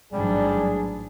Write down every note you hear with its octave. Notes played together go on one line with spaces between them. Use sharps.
A1 G#2 E3 F#3 G3 D4 G#4